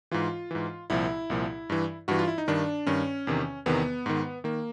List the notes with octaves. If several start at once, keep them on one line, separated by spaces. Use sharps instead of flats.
G#2 E3 F4
G#2 E3
C2 A#2 F3 E4
C2 A#2 F3
G2 E3
G2 E3 F#4
F4
E4
D#4
G2 D#3 D4
G2 D#3 C#4
E2 C3 D#3
E2 C3 D#3 B3
G#2 D#3
D#3 A#3